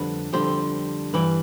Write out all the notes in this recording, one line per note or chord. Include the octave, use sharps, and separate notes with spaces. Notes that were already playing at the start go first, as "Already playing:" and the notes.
Already playing: F2 D3 G3 B4
F2 D3 G3 C5
G2 E3 G3 B4